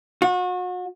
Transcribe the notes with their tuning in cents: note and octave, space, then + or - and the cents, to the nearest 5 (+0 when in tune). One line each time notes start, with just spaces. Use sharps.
F#4 -35